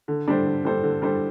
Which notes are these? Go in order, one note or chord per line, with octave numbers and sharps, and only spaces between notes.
D3
G3 D4 A4 C5
D3
G3 D4 A4 C5
D3
G3 D4 A4 C5